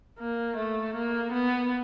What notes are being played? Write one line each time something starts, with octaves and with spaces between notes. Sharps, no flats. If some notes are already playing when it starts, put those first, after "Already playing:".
A#3
A3
A#3
B3